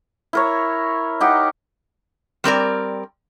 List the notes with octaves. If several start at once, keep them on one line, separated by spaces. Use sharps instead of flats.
E4 A#4 C#5
D#4 G4 F#5
G3 C4 A#4 D5